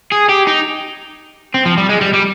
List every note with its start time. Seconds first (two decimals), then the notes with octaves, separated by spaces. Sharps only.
0.12 G#4
0.29 G4
0.47 D#4
1.54 C4
1.65 F3
1.78 G3
1.89 G#3
2.01 G3
2.13 G3